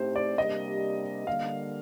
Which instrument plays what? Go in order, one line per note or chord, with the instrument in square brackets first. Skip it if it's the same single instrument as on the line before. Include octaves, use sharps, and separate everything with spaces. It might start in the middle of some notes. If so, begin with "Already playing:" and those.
Already playing: [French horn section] A2 A3 C4 D#4 G4 [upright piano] C5
[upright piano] D5
[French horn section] C3 G3 A#3 D4 G4 [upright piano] D#5
[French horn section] D3 G3 A#3 [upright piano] F5